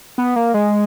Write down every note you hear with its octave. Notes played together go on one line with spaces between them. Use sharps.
B3
A#3
G#3